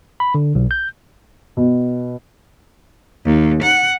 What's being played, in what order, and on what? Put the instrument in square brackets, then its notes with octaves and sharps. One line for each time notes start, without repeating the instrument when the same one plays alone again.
[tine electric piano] B5
D3
B1
G6
[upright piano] B2
[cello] D#2
F#5